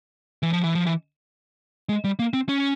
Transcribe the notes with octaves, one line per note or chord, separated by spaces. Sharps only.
E3
F3
E3
F3
E3
G#3
G3
A#3
C4
C#4